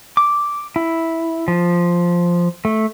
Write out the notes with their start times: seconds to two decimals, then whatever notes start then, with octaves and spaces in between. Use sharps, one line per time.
0.17 D6
0.76 E4
1.48 F3
2.65 A3